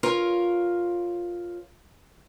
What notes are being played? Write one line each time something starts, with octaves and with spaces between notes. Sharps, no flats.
F4 A#4 C#5